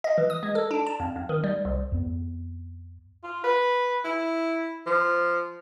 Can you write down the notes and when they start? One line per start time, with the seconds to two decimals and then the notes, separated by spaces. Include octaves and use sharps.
0.04 D#5
0.18 E3
0.30 D#6
0.43 G#3
0.55 A4
0.71 D4
0.87 A5
1.00 F2
1.16 F2
1.29 D#3
1.44 G3
1.65 C2
1.92 F2 B3
3.24 F4
3.44 B4
4.04 E4
4.86 F3